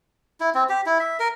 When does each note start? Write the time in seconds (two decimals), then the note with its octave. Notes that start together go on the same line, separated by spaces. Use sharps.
0.40 E4
0.54 C4
0.69 G4
0.86 E4
1.00 E5
1.19 A#4